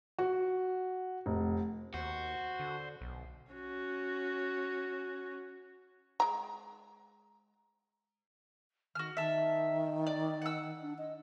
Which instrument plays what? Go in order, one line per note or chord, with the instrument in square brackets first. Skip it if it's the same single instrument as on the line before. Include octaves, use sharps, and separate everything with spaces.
[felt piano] F#4
F1
[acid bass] D#2 [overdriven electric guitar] F#4 [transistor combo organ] C5
[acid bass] D3
B1
[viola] C#4 F#4
[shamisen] G#3 A#5
[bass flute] D#3 [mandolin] F#4 F6
[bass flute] D#3 [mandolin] E5 A5
[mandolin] D5
F#5 E6
[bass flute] D4
D#5